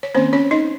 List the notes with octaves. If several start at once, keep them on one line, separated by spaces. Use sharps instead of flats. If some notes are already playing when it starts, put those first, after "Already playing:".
C#5
D#3 A#3 C4 C#4 C5
C#4 C#5
D#4 D#5